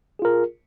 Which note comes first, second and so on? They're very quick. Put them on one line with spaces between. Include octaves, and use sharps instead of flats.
G#4 F4 A#4